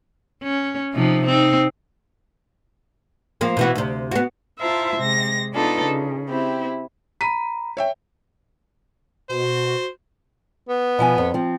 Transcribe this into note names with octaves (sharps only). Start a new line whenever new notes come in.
C#4
C3 F3 D#4
C4 D#4
F3 A#3 C4
B2 E3 F#4
D2 C3
B3 F#4
E4 F4 C5 E5 A5 A#5
C3 G#3 A#6
B3 D4 D#4 F4 A4 B4
C#3
C4 E4 G4
A#5 B5 B6 D#7
C#5 E5 G5
B2 F#4 C5
B3
B2 F3 G#5
F2
F3 C4